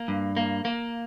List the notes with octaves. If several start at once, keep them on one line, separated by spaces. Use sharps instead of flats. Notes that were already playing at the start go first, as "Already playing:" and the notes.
Already playing: A#3
G2
A#3
A#3